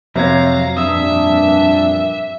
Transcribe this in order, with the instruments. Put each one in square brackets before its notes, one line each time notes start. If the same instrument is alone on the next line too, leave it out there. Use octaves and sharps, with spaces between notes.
[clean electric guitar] F2 [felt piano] C3 F#3 G#6 [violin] F5 A#5
[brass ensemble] G2 A#2 D4 [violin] E5 [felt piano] D#6 E6